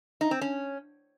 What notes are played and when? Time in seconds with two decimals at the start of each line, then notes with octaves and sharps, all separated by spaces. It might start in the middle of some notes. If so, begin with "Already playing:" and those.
0.21 D#4
0.31 C4
0.41 C#4